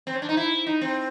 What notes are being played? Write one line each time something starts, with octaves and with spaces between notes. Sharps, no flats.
C4
C#4
D4
D#4
E4
D#4
C4